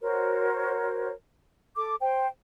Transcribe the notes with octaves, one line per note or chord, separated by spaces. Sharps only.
F#4 A#4 C5 C#5
A4 D6
C5 G5